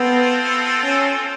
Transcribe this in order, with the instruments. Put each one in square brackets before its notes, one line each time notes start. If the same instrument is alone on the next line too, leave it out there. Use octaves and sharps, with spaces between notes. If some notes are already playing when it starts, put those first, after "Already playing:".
Already playing: [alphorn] B3 [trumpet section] C4 F4 A4
[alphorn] C#4